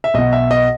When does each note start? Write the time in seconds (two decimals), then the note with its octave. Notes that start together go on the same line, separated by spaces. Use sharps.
0.04 E5
0.14 B1 B2 D#5
0.33 E5
0.51 D#5